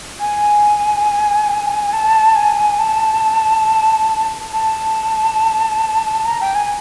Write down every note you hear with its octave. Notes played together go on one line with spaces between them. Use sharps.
G#5
A5
G#5
A5
A5
A#5
G5
G#5